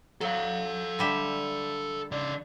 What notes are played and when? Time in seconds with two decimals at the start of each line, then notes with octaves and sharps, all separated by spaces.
0.21 F#3 A4 F5
0.99 D3 G3 E5
2.11 C#3 D5